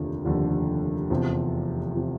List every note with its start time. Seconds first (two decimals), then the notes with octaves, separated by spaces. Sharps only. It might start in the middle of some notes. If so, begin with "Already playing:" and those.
Already playing: F1 D#2 D3 F3
0.25 F1 D#2 D3 F3
1.10 F1 E2 C3 F3
1.95 C3 F3